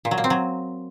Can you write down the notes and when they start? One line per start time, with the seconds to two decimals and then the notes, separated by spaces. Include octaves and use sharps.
0.05 A#2
0.11 F#3
0.18 A#3
0.24 C4
0.30 F#3